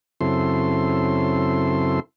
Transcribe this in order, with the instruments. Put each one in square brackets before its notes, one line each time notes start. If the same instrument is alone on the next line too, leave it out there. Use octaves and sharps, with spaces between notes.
[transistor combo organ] F#2 C#3 C4 E4 A4 C6